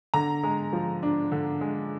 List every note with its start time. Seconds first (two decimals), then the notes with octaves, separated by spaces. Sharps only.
0.14 D3 A#5
0.43 G#3
0.73 F3
1.03 D4
1.32 D3
1.61 G#3